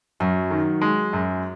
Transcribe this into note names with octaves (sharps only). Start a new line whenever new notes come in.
F#2 F#3
D#3
G#3
F#2